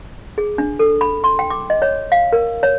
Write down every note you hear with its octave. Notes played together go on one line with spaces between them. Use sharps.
G#4
D4
A4
B5
C6
G5
D6
D#5
C#5
F5
A#4
C#5